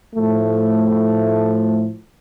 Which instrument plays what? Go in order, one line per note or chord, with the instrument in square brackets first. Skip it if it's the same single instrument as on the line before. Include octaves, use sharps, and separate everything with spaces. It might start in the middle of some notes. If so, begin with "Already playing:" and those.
[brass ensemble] A2 F3 A3